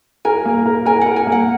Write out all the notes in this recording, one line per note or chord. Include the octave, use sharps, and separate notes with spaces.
A#4 G#5
A#3
A#4
A#4 G#5
A#4 F#5
G#5
A#3
F#5